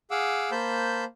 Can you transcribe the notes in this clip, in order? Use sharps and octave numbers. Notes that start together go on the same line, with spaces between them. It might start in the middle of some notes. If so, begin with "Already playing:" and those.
G#4 F5 F#5 D6 E6
A#3 C5 A5 B5 G6